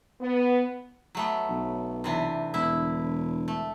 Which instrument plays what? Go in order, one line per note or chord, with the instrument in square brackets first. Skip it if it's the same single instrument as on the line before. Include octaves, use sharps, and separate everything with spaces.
[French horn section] B3
[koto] F#3 A3 B3
[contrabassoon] B1
[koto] C3 E3 D4
[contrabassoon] E1 [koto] D3 E4 E5
[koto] A3